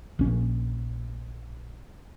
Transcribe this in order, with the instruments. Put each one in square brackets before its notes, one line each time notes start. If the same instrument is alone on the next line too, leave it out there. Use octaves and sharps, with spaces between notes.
[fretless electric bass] A#1 C#4